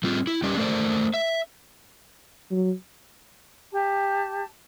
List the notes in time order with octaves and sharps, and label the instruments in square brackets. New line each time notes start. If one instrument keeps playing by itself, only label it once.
[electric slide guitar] G3 C4 F4
E4
G3 C#4 G4 D5
A3 A#4 C5 D5
E5
[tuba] F#3
[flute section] G4 A5